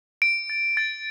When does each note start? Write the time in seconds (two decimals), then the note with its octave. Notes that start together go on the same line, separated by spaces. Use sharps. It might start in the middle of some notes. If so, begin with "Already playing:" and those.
0.22 D7
0.50 A6
0.77 A6